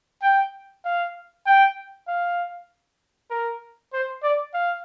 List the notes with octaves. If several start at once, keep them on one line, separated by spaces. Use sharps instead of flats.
G5
F5
G5
F5
A#4
C5
D5
F5